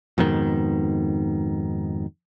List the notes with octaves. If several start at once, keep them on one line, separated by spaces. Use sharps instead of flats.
F2 G#2 B2 D#3